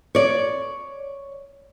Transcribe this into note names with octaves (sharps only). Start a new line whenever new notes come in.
C#5 D5